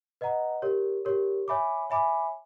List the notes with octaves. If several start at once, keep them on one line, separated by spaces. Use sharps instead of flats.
B4 D#5 F#5 A#5
G4 A#4 C#5
G4 A#4 C#5
C#5 E5 G#5 B5 D6
C#5 E5 G#5 B5 D6